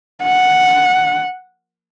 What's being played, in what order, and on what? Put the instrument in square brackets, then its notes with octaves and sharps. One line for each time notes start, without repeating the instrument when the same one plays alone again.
[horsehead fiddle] F#5